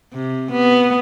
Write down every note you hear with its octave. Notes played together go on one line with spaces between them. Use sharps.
C3
B3